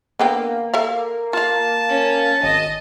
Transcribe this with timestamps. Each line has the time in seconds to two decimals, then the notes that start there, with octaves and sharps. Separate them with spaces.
0.19 D3 A#3 B3 G5
0.74 A4 E5 F5
1.33 F4 F5 A5
1.89 C#4
2.43 G#1 D#5